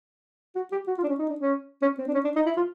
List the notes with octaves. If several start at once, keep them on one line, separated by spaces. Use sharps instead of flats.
F#4
G4
F#4
F4
D4
C#4
D#4
D4
C#4
C#4
C4
D4
C#4
D4
D#4
E4
F4